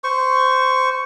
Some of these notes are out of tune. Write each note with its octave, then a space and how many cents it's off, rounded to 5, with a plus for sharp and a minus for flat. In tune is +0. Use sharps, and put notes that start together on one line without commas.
C5 -15 C#6 +0